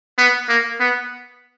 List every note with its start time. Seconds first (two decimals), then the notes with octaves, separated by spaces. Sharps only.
0.18 B3
0.49 A#3
0.80 B3